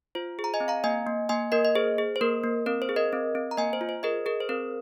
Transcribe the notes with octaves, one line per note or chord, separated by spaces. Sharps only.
F4 C5
G#4
A#5
D#5 G#5
C4
F5 A#5
A#3 D#5 G#5
A#3
A#3 D#5 G#5
A#3 A#4 D#5
D#5
G#4 C5
G#4
C5
A#3 A#4
A#3
C4 A#4
C5
G#4
A#4 D#5
C4
C4
A#5
A#3 D#5 G#5
C5
F4
C5
G#4 A#4 D#5
G#4 A#4
C5
C4 A#4